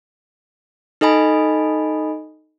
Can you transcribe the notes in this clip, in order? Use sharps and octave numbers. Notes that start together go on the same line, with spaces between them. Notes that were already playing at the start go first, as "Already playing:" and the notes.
D#4 A4 D#5 G#5 B5